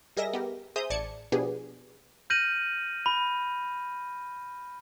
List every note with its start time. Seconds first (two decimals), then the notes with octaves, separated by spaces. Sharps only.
0.17 G3 G#4 A#4 D#5 E5 A#6
0.33 B3 G4 A#4
0.76 G#4 C5 E5 A#5 D#6 G6
0.90 A1 D5 A5 G#6 C#7
1.32 B2 F3 B3 D4 G4 G#4
2.30 F6 G6 A#6 D#7 F#7
3.06 B5